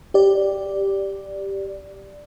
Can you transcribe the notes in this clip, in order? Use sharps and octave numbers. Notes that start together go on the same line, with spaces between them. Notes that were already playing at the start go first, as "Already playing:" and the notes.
G4 D5